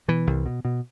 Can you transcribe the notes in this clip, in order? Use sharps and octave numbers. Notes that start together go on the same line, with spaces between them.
B2 E3
C2
B2
B2